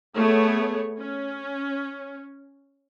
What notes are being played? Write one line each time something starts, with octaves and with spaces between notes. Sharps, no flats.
A3 B3 G#4 C#5
C#4